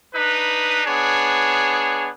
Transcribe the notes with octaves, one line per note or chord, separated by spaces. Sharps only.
D4 D#4 B4
B3 D4 G#4 C#5